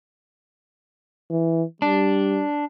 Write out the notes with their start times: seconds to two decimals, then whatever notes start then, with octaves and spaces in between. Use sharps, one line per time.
1.30 E3
1.82 G3 D4